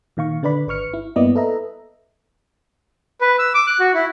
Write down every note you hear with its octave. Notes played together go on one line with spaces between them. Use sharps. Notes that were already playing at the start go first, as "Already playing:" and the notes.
A#2 D#3 F5 C#6
D3 D4 B4 D5 B5
G#1 B4 C#6 F6 C#7
E4
G2 A#3 B3 E4 D5 D#5
A4 B4 D#5 E5 A#5
B4
E6
D6
F#6
F#4
E4